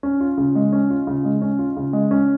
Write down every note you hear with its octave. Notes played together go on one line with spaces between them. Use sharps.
C#4
F4
C#3
G#3
C#4
F4
C#3
G#3
C#4
F4
C#3
G#3
C#4